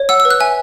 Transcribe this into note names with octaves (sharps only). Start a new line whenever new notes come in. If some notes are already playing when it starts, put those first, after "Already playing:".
Already playing: C#5
F#5 E6
E6
B4
F#6
E5 G#5